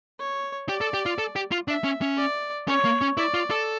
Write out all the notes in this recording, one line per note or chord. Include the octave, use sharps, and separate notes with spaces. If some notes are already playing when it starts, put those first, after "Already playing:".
C#5
G4 D5
A4
G4
F4
A4
G4
F4
D4 E5
C#4
C#4
D5
C#4 C#5
A#3
C#4
E4 D5
F4
A4